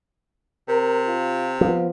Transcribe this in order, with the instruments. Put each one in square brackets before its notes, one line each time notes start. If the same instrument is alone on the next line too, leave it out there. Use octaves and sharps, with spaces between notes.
[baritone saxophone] C3 [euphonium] A#4
[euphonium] F4
[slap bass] F3 [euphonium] B3